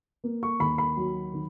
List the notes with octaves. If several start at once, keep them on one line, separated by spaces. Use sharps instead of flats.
A#3
C#6
D#2 B5
B5
F#3
D#3